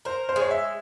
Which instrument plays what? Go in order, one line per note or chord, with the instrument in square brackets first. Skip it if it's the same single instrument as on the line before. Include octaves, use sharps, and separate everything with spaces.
[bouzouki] A#4 [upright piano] C5
[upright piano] C5
[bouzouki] G#3
[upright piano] C#5
E5